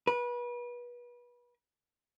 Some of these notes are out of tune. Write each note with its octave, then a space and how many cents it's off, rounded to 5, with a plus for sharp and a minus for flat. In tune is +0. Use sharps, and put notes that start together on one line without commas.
B4 -30